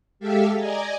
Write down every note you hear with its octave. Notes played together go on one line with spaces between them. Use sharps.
G#3 G4 A4 E5 F5 G5
D5 D#5 G#5 A#5